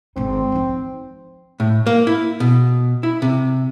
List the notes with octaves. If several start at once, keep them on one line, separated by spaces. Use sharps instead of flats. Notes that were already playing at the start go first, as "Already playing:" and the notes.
G#1 C4 D#4
F3 D#4
A2
A#3
E4
B2
E4
C3